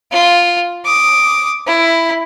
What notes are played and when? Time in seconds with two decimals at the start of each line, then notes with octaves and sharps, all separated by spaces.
0.12 F4
0.85 D6 D#6
1.67 E4